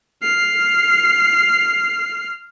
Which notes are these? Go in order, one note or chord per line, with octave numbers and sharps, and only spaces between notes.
F6 C7